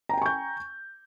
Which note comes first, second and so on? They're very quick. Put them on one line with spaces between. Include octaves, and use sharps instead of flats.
A#5 G5 G#5 C#6 G6